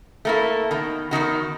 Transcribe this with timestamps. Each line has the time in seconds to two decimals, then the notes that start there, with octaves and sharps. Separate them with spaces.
0.25 A3 A#3 E4
0.71 B2 D#3
1.11 E2 G2 D#3 F#4